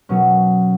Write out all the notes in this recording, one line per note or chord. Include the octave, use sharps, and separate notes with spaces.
B2 F#3 C#4